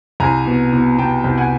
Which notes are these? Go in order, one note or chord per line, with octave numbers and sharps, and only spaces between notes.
C2 G#5 A#5
B2
B2
B2 G5 A5
C2
F#5 G#5